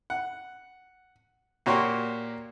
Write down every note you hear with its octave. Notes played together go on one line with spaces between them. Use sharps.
F#5
A#2 A#3 F#4 G4 C#5 C6